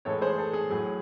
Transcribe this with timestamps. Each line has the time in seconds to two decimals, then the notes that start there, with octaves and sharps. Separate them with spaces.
0.05 A2 E3 G#3 A4 C#5
0.22 G#4 C5
0.38 A4
0.53 G#4
0.70 A2 F#3 G#4